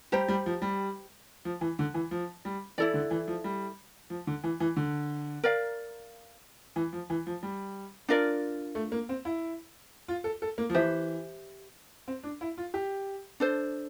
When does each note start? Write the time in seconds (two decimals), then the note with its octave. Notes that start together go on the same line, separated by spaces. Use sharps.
0.12 G3 G4 C5 G5 A#5
0.28 G3
0.46 F3
0.62 G3
1.45 F3
1.61 E3
1.79 D3
1.94 E3
2.11 F3
2.45 G3
2.78 E3 E4 A4 D5
2.94 D3
3.11 E3
3.28 F3
3.44 G3
4.10 F3
4.27 D3
4.44 E3
4.60 E3
4.77 D3
5.43 A#4 D5 F5
6.76 E3
6.93 F3
7.10 E3
7.27 F3
7.43 G3
8.09 D4 F4 A#4 D5
8.75 A3
8.92 A#3
9.09 C4
9.25 E4
10.08 F4
10.24 A4
10.42 A4
10.58 A#3
10.70 F3
10.74 E3 G4 C5 E5
12.08 C4
12.23 D4
12.41 E4
12.58 F4
12.74 G4
13.40 D4 A4 C5